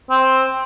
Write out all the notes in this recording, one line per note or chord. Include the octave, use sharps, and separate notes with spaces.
C4